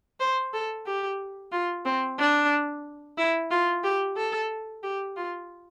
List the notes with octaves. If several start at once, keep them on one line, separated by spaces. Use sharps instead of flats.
C5
A4
G4
F4
C4
D4
E4
F4
G4
A4
G4
F4